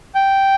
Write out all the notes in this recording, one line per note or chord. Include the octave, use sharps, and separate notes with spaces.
G5